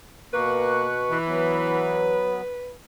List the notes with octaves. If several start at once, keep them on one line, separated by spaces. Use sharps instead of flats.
B2 A#3 B4 C#6 F#6
E3
F#3 B3